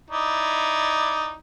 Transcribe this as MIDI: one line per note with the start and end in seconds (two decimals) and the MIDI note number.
0.10 1.33 63
0.10 1.33 64
0.10 1.33 74